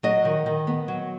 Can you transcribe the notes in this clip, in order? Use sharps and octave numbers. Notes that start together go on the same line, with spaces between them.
F#3 D#5
D#3
D#3
B3
F#3